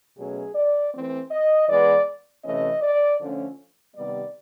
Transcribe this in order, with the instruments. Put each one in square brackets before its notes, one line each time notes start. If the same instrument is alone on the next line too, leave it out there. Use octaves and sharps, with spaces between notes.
[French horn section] B2 F#3 A3 C#4 G#4
D5
E3 A3 C4
D#5
E3 G#3 B3 D5
C3 E3 A3 C#4 D#5
D5
D3 F3 A3 C#4
C3 D#3 G3 B3 D5